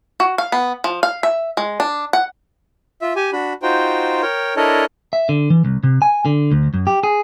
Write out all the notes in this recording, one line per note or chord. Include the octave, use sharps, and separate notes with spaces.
F#4
F5
B3
F3
F5
E5
G#3
D4
F#5
F4 E5
G4 G#5
D4 F#4 B5
D#4 F4 F#4 C5 G5
A#4 C#5 G5
D4 E4 A4 A#4 C#5 D#5
E5
D3
E3
C2
C3
G#5
D3
D2
F#2
G4
G#4